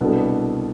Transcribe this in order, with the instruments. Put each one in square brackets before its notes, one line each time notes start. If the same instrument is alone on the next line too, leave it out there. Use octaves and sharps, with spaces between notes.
[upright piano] C2 B2 B3 D4 A4